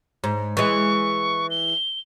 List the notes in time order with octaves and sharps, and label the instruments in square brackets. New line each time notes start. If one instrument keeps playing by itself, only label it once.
[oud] G#2
[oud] E3 G#3 [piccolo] C#6
[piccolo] G7